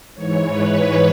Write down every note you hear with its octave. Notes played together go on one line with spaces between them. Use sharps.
G#2 E3 C#5
B4